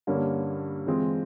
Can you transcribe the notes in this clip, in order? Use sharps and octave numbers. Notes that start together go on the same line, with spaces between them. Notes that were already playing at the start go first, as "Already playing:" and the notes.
G2 D3 G3 A#3 C#4
E3 G#3 C4 F4